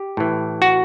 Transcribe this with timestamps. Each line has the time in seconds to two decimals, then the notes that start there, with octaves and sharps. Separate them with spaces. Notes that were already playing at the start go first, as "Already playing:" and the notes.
Already playing: G4
0.17 A2 E3
0.62 F#4